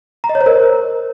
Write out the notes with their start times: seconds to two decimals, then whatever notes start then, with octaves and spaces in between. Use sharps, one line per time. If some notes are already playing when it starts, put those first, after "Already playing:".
0.24 A#5
0.29 D#5
0.35 C#5
0.41 C5
0.46 A#4